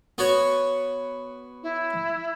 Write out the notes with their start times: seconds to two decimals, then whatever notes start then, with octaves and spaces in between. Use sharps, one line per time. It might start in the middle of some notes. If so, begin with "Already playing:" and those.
0.18 B3 F#4 C#5
1.62 E4